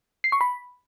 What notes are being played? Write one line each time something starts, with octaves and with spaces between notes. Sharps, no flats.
C7
C#6
B5